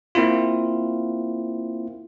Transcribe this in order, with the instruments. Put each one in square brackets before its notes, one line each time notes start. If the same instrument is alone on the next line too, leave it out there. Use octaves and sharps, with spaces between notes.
[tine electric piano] A#3 C4 E4 F4